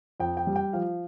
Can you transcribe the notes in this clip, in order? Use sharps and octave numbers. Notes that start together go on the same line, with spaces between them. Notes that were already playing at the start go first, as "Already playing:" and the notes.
F2 G5
G5
G3
G5
F3 F5